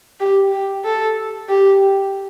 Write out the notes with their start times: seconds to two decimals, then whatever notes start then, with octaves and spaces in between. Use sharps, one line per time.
0.20 G4
0.52 G4
0.84 A4
1.49 G4